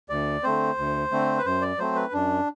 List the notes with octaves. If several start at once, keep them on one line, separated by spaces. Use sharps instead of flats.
D2 D5
D3 A3 C4 C5
D2
D3 A3 C4
B4
F#2 C5
D5
F#3 A3 C4 C5
B4
F#2 D4